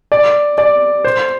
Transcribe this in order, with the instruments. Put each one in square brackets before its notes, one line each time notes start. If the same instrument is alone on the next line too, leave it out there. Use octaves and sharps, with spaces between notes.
[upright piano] D5
D5
C5